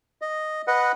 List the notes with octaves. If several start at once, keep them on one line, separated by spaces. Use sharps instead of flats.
D#5
B4 D#5 F#5